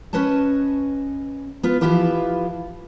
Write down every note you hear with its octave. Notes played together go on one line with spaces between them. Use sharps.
C#4 B4 C#5 D#5 A5
B3 F4 B4
E3 F3 E4 F4 G4 B4